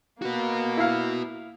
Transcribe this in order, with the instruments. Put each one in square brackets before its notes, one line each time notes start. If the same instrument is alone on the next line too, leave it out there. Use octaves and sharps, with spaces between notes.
[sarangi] A#3 [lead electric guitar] F#4 B4
[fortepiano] E4 F5